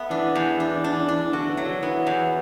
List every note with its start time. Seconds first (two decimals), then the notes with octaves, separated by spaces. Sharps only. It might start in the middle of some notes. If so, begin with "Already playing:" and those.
Already playing: A3 B3
0.10 E3 D4
0.35 E2
0.60 D4
0.84 D4
1.08 D4
1.33 D3 F#4
1.49 E3
1.57 F#3
1.66 D3
1.83 E3 B3
2.07 E2